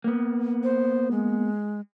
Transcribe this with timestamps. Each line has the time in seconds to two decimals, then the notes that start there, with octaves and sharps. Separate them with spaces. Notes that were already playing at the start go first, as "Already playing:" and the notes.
0.04 A#3 B3
0.64 C5
1.11 G#3